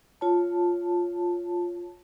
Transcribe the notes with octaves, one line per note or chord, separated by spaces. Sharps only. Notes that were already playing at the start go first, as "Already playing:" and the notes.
F4 C#5 A5